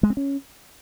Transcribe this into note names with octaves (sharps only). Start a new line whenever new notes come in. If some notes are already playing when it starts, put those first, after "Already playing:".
G#3
C4
C#4